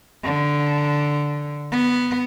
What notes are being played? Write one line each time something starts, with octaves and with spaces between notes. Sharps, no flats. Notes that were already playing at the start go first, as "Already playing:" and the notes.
D3
B3